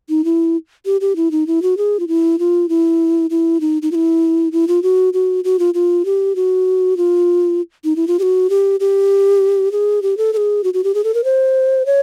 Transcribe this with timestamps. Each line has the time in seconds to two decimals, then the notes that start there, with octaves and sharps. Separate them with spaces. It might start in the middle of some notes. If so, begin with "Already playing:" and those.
0.09 D#4
0.24 E4
0.86 G4
1.01 G4
1.16 E4
1.31 D#4
1.47 E4
1.62 F#4
1.77 G#4
2.00 F4
2.08 E4
2.39 F4
2.69 E4
3.30 E4
3.61 D#4
3.82 D#4
3.92 F4
3.95 E4
4.52 E4
4.68 F4
4.83 F#4
5.14 F#4
5.44 F#4
5.59 F4
5.74 F4
6.05 G4
6.36 F#4
6.97 F4
7.85 D#4
7.96 E4
8.07 F4
8.19 G4
8.23 F#4
8.50 G4
8.80 G4
9.72 G#4
10.02 G4
10.17 A4
10.33 A4
10.37 G#4
10.64 F#4
10.74 F#4
10.84 G4
10.94 G#4
11.04 A4
11.14 A#4
11.24 C5
11.86 C#5